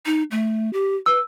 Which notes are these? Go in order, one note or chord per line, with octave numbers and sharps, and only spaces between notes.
D#4
A3
G4
B4 E6